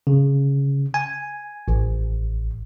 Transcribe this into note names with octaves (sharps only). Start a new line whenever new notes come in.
C#3
G#5
A1